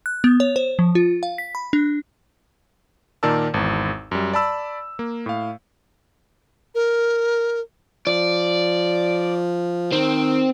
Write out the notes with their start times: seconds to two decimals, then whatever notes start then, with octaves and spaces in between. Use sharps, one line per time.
0.06 F#6
0.24 B3
0.40 C#5
0.56 C5
0.79 F3
0.95 F4
1.23 F5
1.38 B6
1.55 B5
1.73 D4
3.23 A#2 D#3 A#4 D5 A5 E6
3.54 G#1 E2
4.11 F#2 G3
4.33 D5 A5 B5 E6
4.99 A#3
5.26 A2 F5
6.75 A#4
8.07 F3 D5
9.92 D#3 C4